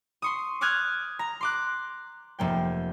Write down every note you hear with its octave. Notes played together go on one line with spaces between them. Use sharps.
C6 C#6 D#6
D6 D#6 F6 F#6 G#6
A#5
C6 D6 F#6
F1 A#3 G5